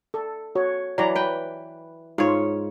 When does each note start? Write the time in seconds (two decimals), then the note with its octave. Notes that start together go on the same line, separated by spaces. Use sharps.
0.14 A4
0.55 F#4 C#5
0.98 E3 F#3 D5 A#5
1.15 B4 G5
2.18 G#2 F4 C#5